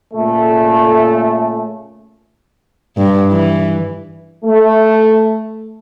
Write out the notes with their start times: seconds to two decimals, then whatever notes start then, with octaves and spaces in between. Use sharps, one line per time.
0.14 A#2 C#3 A3
2.97 G2
3.31 E3
4.45 A3